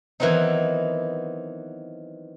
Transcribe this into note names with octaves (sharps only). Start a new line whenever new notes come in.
D#3 E3 F#3 B3 C4 D#4